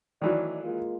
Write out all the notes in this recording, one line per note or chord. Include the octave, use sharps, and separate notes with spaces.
D#3 E3 F#3 A3 D#4 D5
G#3 A#3 F4